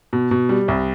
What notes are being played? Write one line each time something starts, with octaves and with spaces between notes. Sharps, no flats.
B2
B2
G3
C2